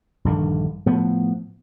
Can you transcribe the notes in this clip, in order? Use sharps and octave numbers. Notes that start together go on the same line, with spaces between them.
A#1 G2 D3 D#3
A2 F3 B3